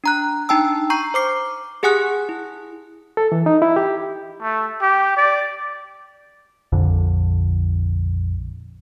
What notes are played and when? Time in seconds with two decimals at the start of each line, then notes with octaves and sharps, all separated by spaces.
0.04 D4 A#5 F#6
0.49 D4 D#4 G5 A5 E6
0.90 A#5 C#6 G6 C7
1.14 C5 D6 C7
1.83 G4 G#4 F#5 G#5 D#6 F#6
2.29 E4
3.17 A4
3.32 E3
3.46 D#4
3.62 E4
3.76 G4
4.42 A3
4.82 G4
5.17 D5
6.72 A#1 F2 D3